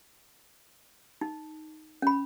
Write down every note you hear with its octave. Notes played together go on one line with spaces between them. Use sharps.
D#4
C#4 B5